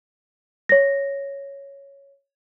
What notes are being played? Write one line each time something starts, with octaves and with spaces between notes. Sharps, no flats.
C#5 A#6